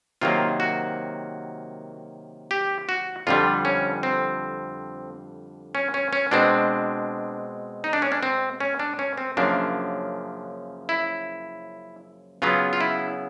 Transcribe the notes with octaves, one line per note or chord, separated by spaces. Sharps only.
C3 D#3 F#3 A#3 F4
F#4
G4
F#4
F2 D3 G3 F4
C#4
C4
C#4
C#4
C#4
B2 G#3 C4 D4
D#4
D4
C#4
D4
C4
C#4
D4
C#4
C4
F#2 C#3 F3 A#3 D4
E4
C#3 F#3 B3 F4
F4
E4